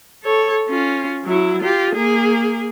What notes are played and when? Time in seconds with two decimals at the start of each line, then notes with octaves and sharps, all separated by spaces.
0.23 A4 C#5
0.68 C#4 F4
1.25 F#3 E4
1.62 F4 G4
1.95 A#3 G#4